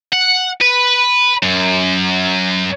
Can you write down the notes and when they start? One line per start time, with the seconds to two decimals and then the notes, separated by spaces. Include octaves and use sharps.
0.13 F#5
0.61 B4
1.42 F#2